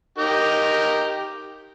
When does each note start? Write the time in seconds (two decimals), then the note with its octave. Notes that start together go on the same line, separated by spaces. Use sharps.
0.18 D#4 G4 A#4